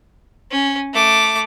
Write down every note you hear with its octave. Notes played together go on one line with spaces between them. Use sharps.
C#4
A3 D6